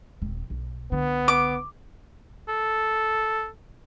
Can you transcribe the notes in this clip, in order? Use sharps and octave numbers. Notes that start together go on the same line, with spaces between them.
D#1 C4
B1
C2 D3 B3
D6
A4